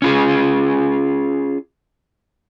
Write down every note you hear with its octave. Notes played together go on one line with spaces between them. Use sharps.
C#4 F4 G#4